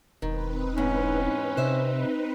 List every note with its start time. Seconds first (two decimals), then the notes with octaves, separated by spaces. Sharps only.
0.22 E1 D#3 C4 D#4 B4
0.78 E2 G#2 C#4
1.57 C3 C5 E5